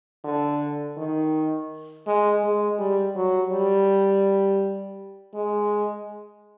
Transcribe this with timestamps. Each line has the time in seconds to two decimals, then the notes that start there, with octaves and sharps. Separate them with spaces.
0.24 D3
0.97 D#3
2.07 G#3
2.44 G#3
2.79 G3
3.16 F#3
3.53 G3
5.35 G#3